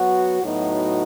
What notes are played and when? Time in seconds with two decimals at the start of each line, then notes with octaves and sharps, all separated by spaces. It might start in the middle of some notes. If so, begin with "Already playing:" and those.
Already playing: F#3 B3 F#4
0.42 A2 F#3 B3 D#4 F#4